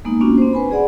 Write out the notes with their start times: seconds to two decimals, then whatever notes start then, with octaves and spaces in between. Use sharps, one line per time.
0.05 G#3 A#3 B3 D#4
0.21 A#3 B3 C#4 D4 F4 F#4
0.38 C4 C5
0.53 B4 G#5 B5
0.71 G#4 D5 F#5